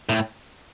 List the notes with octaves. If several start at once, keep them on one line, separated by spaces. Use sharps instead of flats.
A2